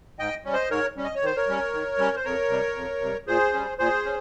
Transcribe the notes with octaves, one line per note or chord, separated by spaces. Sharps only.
G#2 D#5 G5
G3 C#4
C5 D#5
G#2 A#4 C#5
G3 C#4
D#5
C#5
D#3 C5
A#4 C#5
G3 C#4
D#3
G3 C#4
C5
F2 A#4 C#5
C3 G3
F2
C3 G3
A#2 G#4 C5
G3 C#4
A#2 G#4 C5
C#4